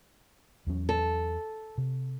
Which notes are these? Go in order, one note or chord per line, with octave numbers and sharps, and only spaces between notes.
E2 F#3 C#4
A4
C3